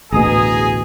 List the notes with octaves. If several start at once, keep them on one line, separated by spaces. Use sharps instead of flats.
A1 D2 B2 G#4 A#5 D#6